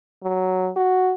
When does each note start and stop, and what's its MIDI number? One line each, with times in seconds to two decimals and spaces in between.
0.23 0.69 54
0.76 1.14 66